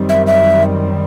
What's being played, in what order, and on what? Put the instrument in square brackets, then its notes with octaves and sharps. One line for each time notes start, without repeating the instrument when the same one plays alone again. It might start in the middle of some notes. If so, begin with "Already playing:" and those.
Already playing: [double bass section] F#2 D#3 G3 C4
[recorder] E5
E5